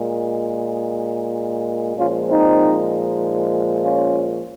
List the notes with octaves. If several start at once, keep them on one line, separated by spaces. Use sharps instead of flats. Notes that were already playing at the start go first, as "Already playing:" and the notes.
Already playing: A#2 G#3
A#2 F3 G#3 C#4 F4
C4 D#4
C#4 F4